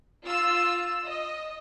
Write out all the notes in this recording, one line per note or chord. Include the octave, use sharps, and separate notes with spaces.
F4 E6
D#5